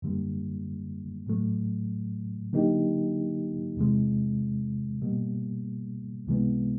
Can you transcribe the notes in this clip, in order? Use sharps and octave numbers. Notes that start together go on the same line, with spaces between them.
F#2 D3 G3 A#3
A2 F#3 A3
D3 F#3 A#3 D#4 G4
E2 C3 E3 G#3
B2 G3 A#3
C#2 C3 E3 G#3 B3